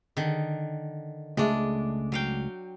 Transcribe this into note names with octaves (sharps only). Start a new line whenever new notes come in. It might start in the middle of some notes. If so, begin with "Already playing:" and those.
D3 D#3
C#2 G#3 A3 D4 E5
F#3 F5 G5